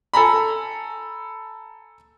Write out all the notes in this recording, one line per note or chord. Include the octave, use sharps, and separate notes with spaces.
A4 G#5 A#5 B5